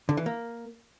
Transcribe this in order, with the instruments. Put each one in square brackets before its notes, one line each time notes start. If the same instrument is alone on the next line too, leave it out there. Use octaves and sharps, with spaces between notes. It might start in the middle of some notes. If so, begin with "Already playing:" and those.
[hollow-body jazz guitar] D3
E3
A#3